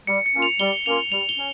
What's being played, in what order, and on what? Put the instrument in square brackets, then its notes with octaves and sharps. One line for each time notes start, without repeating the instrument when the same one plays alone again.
[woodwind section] G3 [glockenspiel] C#7
[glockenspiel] C#7
[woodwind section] A#3 C#4 F4
[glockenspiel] F7
[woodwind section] G3 [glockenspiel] G7
[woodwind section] A#3 C#4 F4 [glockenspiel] F7
[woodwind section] G3 [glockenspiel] F7
[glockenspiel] G7
[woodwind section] C#4